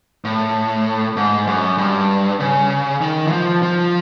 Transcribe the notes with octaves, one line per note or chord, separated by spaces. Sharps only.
A2
G#2
F#2
G2
C#3
D#3
E3
F3
F3